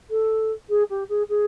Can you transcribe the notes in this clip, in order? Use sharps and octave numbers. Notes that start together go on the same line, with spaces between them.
A4
G#4
G4
G#4
G#4